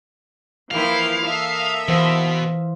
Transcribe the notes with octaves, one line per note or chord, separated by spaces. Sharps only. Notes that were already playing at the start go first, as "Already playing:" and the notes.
E3 F3 A#3 E4 F5 G5
A#3 A4 D#5 E5
B2 E3 C5 F5